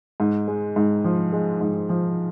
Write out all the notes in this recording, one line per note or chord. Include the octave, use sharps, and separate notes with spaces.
G#2
G#3
G#2
F3
G#3
G#2
F3